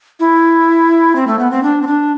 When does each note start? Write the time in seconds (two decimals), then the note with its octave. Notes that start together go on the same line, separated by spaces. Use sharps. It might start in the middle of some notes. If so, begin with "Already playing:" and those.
0.20 E4
1.15 C4
1.27 A3
1.39 B3
1.51 C4
1.63 D4
1.82 C4
1.87 D4